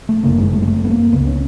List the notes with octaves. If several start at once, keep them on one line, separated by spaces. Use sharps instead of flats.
A3
G1 F#2 C#3 A#3
G#3
A3
G#3
A3
B3
A#3
C#2 C#3 B3
C#4